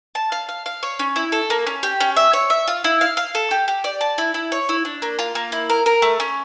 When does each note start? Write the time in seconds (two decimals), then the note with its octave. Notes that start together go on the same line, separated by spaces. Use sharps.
0.15 A5
0.32 F5
0.49 F5
0.66 F5
0.83 C#5
0.99 C#4
1.16 E4
1.32 A4
1.50 A#3
1.67 C#4
1.83 G4
2.00 C#4
2.16 E5
2.33 C#5
2.50 E5
2.68 F4
2.84 E4
3.01 F5
3.17 F5
3.35 A4
3.51 G4
3.68 G4
3.84 D5
4.01 A5
4.18 E4
4.34 E4
4.52 C#5
4.69 E4
4.85 D4
5.02 A#3
5.19 F4
5.35 A#3
5.52 E4
5.70 A#4
5.86 A#4
6.02 A3
6.20 C#4